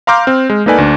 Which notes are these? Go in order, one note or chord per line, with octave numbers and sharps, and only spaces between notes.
F5 A#5 C6 D6 F6 G6
C4
G#3
A#3 D#4 A4 B4 D5 G#5
D2 D4